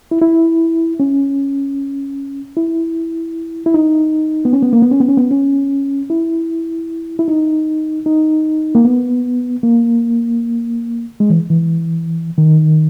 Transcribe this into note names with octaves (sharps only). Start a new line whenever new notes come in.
E4
E4
C#4
E4
E4
D#4
B3
C#4
B3
A#3
B3
C#4
B3
C#4
B3
C#4
E4
E4
D#4
D#4
A#3
B3
A#3
G#3
E3
E3
D#3